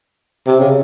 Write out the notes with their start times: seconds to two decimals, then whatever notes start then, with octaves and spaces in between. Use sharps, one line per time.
0.47 C3
0.60 C#3